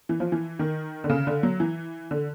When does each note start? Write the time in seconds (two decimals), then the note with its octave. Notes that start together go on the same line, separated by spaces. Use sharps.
0.09 E3
0.20 F3
0.32 E3
0.59 D#3
1.04 D3
1.09 C#3
1.27 D3
1.43 F#3
1.60 E3
2.11 D3